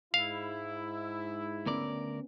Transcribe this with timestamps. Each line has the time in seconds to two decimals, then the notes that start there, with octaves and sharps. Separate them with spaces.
0.14 G#2 E4 F5
1.66 D2 B3 C#4 A#4 D5